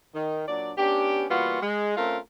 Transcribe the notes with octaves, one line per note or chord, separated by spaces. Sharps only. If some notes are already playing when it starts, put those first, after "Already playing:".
D#3
A#2 F#3 D4 D5
B3 C#4 D4 G4
E3 G3 A#3 B3 F4 F#4
G#3
A3 C4 C#4 F4 A#4